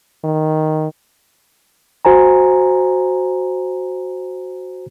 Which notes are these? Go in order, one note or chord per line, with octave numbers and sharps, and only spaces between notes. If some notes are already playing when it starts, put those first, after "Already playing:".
D#3
F#4 C5 G#5 A#5